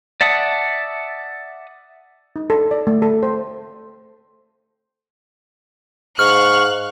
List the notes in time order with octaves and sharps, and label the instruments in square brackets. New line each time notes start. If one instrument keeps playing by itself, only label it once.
[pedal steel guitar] D5 E5 F#5 A5 D#6
[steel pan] D#4
A4
D5
A3
A4
C5
[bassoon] G#2 [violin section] F5 F#6 [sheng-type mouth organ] C#6 [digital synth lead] F6